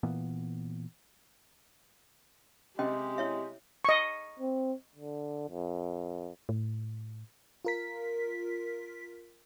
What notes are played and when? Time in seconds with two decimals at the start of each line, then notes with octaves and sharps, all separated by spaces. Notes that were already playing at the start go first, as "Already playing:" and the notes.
0.03 A#2 E3 A#3 B3
2.79 C3 G#3 C#4 G4 D#5 G5
3.18 E4 C#5 E5
3.85 D#5 C#6
4.39 C4
4.95 D3
5.50 F2
6.49 A2
7.65 F4 A#4 B6